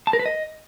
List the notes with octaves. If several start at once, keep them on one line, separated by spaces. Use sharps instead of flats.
A5
A#4
B4
D#5